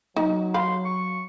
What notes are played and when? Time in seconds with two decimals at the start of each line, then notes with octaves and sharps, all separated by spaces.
0.16 F#3 D#4
0.54 F5 B5 C6
0.85 C#6